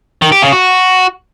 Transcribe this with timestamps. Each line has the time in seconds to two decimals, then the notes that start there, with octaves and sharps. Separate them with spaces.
0.22 D#3
0.32 G4
0.42 C#3
0.52 F#4